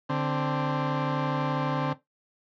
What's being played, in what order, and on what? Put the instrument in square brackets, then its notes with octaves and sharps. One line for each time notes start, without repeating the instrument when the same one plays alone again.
[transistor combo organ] D3 C4